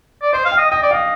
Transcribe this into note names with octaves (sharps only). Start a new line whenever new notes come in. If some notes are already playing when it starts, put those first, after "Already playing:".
D5
C5 D#5
F5
G5
D#5
D#5 G5
D5
D#5 F5